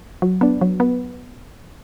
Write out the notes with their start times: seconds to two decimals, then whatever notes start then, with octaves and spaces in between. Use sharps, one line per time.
0.22 F#3
0.41 B3 D4
0.61 F#3
0.80 B3